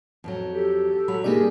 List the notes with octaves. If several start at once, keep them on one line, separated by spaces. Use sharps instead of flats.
F2 E3 F#3
G4 A4
F#3 B5
C3 G3 A#3 D4 D#4 G4 G#4 D5